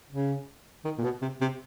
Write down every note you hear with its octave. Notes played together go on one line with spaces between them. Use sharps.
C#3
D#3
A#2
B2
C3
C3